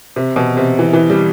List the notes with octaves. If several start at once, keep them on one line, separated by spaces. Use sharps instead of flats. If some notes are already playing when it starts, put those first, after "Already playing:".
C3
B2
C3
E3
E3
G3